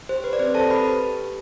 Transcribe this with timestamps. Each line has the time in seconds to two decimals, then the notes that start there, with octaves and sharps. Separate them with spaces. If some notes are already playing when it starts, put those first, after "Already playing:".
0.09 G4 C5
0.24 B4
0.33 D5
0.39 C4 C5
0.54 A4 A5
0.70 G4 B4 B5
1.01 G4